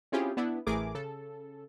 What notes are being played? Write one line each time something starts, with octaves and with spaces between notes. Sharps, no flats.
C4 C#4 E4 F4 G4 G#4
B3 D4 E4
A1 E3 A3 G#4 A#4 D6
C#3 A4